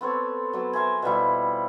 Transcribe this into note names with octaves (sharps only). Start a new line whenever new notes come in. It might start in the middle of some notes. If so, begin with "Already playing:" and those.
B3 C4 A4 C#5
F#3 B3
A#4 C5 E5 G#5
B2 F3 G3 E4